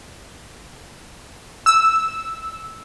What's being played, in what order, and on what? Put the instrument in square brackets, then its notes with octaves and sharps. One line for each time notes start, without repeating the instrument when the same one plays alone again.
[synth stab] E6